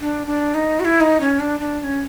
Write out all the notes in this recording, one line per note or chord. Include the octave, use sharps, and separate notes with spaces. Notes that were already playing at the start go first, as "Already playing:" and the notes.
D4
D4
D#4
F#4
E4
D#4
C#4
D4
D4
D4
C#4